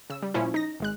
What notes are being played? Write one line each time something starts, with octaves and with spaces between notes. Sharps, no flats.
C#3 E6
G3
A#2 F3 C#4 E4
D#4 A#6
G#1 G#3 F#6